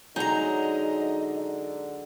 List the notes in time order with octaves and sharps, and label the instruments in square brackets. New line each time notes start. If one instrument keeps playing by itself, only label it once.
[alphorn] D3 [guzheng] F#3 G#3 G#4 [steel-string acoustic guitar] D#4 A#5 [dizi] D#5